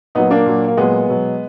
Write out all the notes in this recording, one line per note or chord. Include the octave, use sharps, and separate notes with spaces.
A#2 F#3 B3 D#4
A#3 D4
A#2 F#3
A#3
A#2 F#3 G#3 B3
B2 F#3